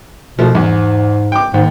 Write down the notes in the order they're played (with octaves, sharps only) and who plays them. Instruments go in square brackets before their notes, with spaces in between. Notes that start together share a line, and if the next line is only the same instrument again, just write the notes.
[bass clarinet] B2 [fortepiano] F3 A3
[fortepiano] E2 [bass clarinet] G#2
[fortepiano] G5 D6
[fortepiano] D#2 [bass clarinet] G#2